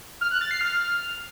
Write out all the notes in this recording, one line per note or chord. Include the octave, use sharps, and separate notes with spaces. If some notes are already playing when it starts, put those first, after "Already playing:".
F6
F#6
A6
C7
F6